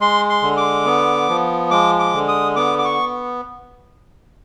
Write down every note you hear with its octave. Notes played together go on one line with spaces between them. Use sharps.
G#3 C6
C6
D3
D6
B3
F3
G#3 D6
D6
D3
D#6
B3 D6
D6
C#6